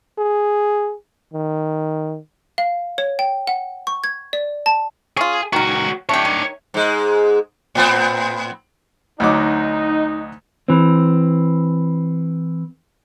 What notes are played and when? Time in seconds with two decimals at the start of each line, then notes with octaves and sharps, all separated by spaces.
0.18 G#4
1.33 D#3
2.58 F5
2.98 C#5
3.19 G5
3.47 F#5
3.87 C#6
4.04 G#6
4.33 D5
4.66 A5
5.17 C#4 F4 G#4
5.53 C#2 D#3 F#4 A#4
6.09 A3 D4 G4 C#5
6.25 D#3
6.74 G#2 G#3
7.75 A2 B3 C4
9.20 D2 F#3 D#4 D6
10.68 E3 C4